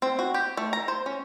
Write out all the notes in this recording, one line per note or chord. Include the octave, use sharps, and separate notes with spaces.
C4
F#4
G4
A3
A#5
C5
C#4